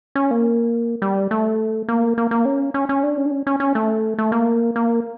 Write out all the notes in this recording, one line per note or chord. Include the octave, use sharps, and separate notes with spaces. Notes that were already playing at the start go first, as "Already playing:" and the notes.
C#4
A#3
G3
A3
A#3
A#3
A#3
C#4
C#4
C#4
D4
C#4
D4
C#4
C#4
C#4
A3
A3
A#3
A#3